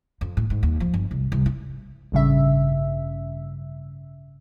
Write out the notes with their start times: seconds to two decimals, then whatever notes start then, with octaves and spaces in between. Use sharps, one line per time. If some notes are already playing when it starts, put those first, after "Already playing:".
0.21 F2
0.37 A2
0.50 G#2
0.63 D#2
0.80 F3
0.94 G1
1.11 C2
1.32 C2
1.46 E4
2.12 A1 G2 C#3 E5